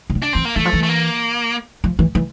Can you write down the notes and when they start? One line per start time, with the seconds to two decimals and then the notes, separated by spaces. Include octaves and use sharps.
0.10 C3
0.15 D3
0.22 D4
0.33 E3 C4
0.45 A#3
0.56 E3 A3
0.65 F3
0.73 E3
0.83 A3
0.89 A#3
1.84 F3
1.99 E3
2.15 E3